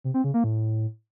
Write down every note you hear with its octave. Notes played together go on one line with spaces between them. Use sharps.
C3
C4
C#3
A#3
A2